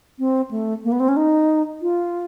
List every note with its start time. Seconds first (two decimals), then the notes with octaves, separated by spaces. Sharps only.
0.19 C4
0.51 A3
0.84 A#3
0.92 B3
1.00 C4
1.09 C#4
1.17 D#4
1.82 F4